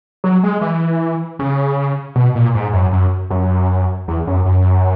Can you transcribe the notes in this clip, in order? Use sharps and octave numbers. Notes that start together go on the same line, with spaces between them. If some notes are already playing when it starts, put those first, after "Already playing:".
F#3
G#3
E3
C#3
B2
A#2
G#2
F#2
F#2
F#2
E2
F#2
F#2